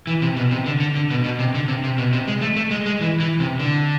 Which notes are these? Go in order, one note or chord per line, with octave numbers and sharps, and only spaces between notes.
E3
C3
B2
C3
D3
D3
D3
B2
B2
C3
D3
C3
C3
B2
C3
G#3
A3
A3
G#3
G#3
E3
E3
C3
D3